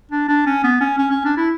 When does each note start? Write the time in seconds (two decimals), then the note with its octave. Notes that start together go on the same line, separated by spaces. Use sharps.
0.11 D4
0.29 D4
0.46 C#4
0.64 B3
0.81 C#4
0.98 C#4
1.11 C#4
1.25 D4
1.37 E4